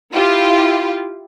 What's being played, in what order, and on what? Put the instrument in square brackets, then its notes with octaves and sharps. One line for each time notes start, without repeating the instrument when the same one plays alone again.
[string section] E4 F4 G4